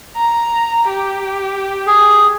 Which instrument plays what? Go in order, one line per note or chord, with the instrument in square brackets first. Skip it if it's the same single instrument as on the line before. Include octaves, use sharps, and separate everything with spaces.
[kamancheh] A#5
G4
[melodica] G#4